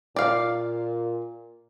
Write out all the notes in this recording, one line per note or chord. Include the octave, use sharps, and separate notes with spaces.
A#2 D5 F5